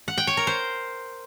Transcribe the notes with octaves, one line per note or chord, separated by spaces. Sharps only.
F#5
G5
C#5
A#4
C5